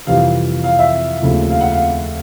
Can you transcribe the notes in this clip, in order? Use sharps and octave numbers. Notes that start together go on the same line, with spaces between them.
F2 C3 E3 G3 F5
F5
E5
D#2 C#3 F3 A3
F5
F#5
F5